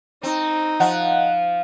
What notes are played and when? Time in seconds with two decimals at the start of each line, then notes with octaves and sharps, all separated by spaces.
0.23 C4 D#4
0.80 F3 D#5 F#5 F#6